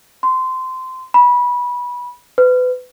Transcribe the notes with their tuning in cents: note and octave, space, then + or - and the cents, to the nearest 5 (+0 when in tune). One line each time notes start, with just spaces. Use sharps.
C6 -20
B5 -20
B4 +30